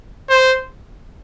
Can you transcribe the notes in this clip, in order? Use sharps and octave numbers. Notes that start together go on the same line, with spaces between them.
C5